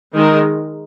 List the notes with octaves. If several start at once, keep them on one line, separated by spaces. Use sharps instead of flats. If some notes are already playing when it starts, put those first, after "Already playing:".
D#3 G#3 D#4 A#4